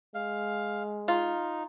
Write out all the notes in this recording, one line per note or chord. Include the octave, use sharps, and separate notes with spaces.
G#3 F5
D#4 F4